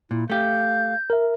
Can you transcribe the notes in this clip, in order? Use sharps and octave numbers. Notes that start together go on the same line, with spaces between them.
A#2 E4
A3 G4 F5 G6
A#4 E5